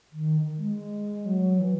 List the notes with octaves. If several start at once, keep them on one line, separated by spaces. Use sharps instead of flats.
D#3
G#3
F#3
E3